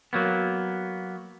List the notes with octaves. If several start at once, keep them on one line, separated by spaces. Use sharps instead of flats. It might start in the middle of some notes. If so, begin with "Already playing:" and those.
F#3 A#3 B3